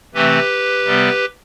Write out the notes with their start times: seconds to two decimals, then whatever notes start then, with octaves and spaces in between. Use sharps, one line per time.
0.14 C3 E3 A3 C4 G4 B4
0.85 C3 G3 B3